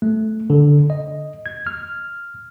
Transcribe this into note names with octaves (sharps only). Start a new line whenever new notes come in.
A3
D3
D#5
G#6
F6